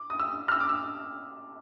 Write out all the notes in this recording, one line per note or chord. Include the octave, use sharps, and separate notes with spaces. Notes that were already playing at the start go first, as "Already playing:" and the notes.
Already playing: D6
D#6
E6
F6
E6
D6
E6